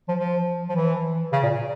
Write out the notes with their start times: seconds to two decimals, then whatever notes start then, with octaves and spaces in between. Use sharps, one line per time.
0.08 F3
0.19 F3
0.69 F3
0.75 E3
1.33 C#3
1.43 A#2